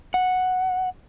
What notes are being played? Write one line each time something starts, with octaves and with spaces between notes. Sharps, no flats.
F#5